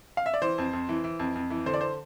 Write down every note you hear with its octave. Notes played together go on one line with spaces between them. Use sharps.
F5
E5
D5
E3 C5
F2
F2
E3
E3
F2
F2
E3
D3 C5
D5
C5